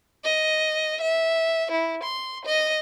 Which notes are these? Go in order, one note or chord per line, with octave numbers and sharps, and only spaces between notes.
D#5
E5
E4
C6
D#5